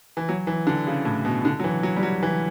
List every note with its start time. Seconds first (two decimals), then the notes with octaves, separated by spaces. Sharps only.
0.17 E3
0.29 F#3
0.47 E3
0.67 D3
0.87 C#3
1.05 A2
1.25 B2
1.45 D3
1.60 F#3
1.64 E3
1.83 F#3
1.96 G3
2.03 F#3
2.23 E3